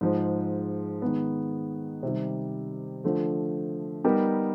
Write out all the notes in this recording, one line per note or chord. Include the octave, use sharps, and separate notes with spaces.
G#2 F3 G#3
D#3 G#3 B3
C3 D#3 G3
D3 F3 A3
G3 B3 D#4 G4 A#4